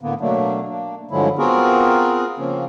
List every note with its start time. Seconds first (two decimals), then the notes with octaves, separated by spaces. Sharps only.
0.01 A2 D3 A#3 B3
0.21 B2 F#3 A3 A#3 D4
0.69 A#3 D4
1.11 G2 D3 F3 F#3 G#3 E4
1.38 B3 C4 F4 F#4 G#4 A#4
2.38 C#3 F3 A#3 C4 C#4